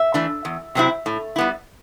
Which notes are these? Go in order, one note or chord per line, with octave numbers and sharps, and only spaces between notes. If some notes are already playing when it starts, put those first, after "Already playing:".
Already playing: E5
E3 A3 D4
E2
C3 F#3 C4 E4
A2
G3 B3 E4